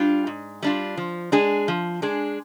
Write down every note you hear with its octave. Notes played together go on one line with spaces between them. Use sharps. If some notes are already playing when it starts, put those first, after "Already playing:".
Already playing: G3 D4 F4
G#2
G3 D4 F4
F3
G#3 D4 G#4
F3
G#3 D4 G#4